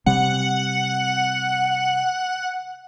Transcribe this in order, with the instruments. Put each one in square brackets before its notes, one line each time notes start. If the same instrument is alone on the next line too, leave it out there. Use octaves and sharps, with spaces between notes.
[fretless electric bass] C3 G3 C4 [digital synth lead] F#5